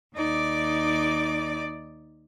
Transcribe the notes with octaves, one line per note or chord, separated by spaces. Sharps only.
D#2 D#4 D5 D6